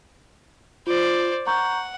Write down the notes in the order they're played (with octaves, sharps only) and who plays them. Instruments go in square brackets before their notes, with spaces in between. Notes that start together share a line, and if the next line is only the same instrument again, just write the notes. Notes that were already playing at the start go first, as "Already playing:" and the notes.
[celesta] F4 [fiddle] C5 D5
[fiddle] F#5 [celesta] A#5 C#6 G6